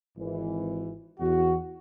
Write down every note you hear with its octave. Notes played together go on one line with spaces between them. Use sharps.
G#1 G#2 E3
E2 F#4